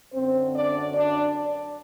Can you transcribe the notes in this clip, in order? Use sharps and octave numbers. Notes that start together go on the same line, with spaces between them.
F#2 D3 F#3 C4 C5
D4 D5
D4 D5